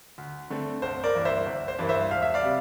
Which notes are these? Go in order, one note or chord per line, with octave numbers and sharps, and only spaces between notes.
D2
D3 A3 C4
G1 C5
A#4 D5
G2 E3 A#3
C5 E5
G1
C5
G2 E3 A#3
C5 E5
E1 F5
E5
D5 F5
C3 G3